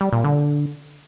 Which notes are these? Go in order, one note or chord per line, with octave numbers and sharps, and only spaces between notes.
G3
A#2
D3